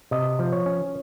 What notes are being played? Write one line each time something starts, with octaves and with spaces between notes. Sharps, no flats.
C3 D#5
F3
C#5
C#4